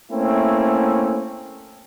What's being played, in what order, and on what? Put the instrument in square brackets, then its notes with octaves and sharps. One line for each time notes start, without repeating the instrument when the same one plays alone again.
[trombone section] A3 A#3 C4 C#4 E4